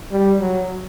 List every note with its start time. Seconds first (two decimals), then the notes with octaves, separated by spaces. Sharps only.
0.11 G3
0.40 F#3